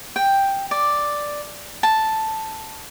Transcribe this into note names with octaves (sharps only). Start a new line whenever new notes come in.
G5
D5
A5